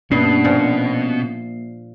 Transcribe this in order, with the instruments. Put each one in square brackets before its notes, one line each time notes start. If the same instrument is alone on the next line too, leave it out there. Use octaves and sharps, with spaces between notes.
[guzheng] G2 [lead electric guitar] B2 [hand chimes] A#3 C7 [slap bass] C#4
[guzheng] A#2 F3